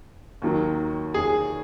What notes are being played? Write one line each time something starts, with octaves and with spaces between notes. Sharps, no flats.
D#2 D#3 F#3
G#4